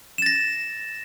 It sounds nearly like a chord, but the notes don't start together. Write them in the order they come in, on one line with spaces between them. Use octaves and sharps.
E7 A6 A#6